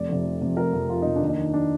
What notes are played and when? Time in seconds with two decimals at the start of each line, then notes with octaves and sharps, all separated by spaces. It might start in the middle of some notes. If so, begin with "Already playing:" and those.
Already playing: F1 D5
0.09 F2 C3
0.25 F1
0.41 F2 C3
0.57 F1 A#4
0.73 F2 C3
0.89 F1 F4
1.02 F2 C3 D#4
1.16 D4
1.22 D#2
1.29 D#4
1.38 D#3
1.54 D4